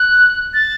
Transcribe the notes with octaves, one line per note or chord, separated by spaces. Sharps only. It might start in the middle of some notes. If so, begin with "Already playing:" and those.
Already playing: F#6
A6